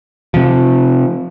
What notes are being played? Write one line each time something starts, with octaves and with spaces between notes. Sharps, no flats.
C3 F3